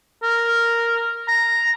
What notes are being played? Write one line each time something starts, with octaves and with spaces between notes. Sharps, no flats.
A#4
A#5